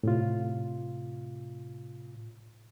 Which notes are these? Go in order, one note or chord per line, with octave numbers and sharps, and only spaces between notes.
A2 C3 F4